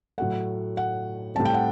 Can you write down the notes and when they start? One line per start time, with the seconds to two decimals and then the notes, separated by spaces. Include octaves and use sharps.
0.18 A2 F#3 A3 F#5
0.77 F#5
1.35 A2 G3 C4 A5
1.45 G5
1.54 F#5